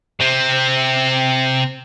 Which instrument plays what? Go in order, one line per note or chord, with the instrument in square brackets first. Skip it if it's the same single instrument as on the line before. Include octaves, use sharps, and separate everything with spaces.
[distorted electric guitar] C3 C4